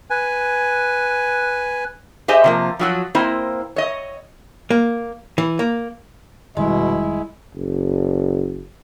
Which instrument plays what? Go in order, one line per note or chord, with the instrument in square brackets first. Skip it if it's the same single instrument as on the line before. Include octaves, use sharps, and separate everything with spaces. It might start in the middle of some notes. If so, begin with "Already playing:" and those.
[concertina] B4 G#5
[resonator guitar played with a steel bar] G4 G#4 C5 D#5 E5 G#5
C3 F3 A#3
F3 F#3 F#4
A#3 C4 E4 C5 D#5
C#5 D#5
[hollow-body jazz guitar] A#3
E3
A#3
[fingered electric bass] F1 D#3 G3 [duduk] B2 [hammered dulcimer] G#3 [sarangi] E4
[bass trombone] F#1